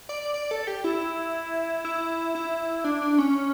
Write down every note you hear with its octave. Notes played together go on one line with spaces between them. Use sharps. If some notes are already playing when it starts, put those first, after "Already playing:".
D5
D5
A4
G4
E4
E4
E4
D4
D4
C#4